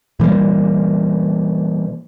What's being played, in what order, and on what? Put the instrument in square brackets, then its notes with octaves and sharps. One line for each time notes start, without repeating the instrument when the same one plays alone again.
[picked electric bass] A#2 E3 G3 A#3